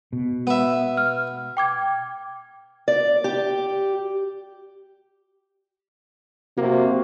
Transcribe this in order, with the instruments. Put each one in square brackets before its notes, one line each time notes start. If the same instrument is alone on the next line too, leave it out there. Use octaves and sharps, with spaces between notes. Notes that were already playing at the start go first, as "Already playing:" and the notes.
[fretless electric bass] B2
[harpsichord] B3 E5
[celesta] F6
G5 D6 G#6
[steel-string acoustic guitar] D5
G4
[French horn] C3 [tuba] A#3 [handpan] F#4